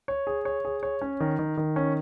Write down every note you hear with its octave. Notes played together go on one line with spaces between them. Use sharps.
C#5
G#4
C#5
G#4
C#5
C#4
D#3
D#3
D#3
C#4